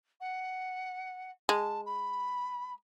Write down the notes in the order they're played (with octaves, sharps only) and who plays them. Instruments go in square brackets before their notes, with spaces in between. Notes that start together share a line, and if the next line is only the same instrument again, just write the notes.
[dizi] F#5
[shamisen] G#3 [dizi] A5
[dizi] B5